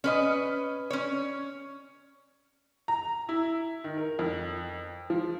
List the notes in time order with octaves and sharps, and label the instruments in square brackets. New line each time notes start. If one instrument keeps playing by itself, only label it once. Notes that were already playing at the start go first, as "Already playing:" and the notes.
[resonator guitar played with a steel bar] C#4 B4 D#5
C#4 C#5
[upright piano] A#5
E4
D#3
A#4
F2
F3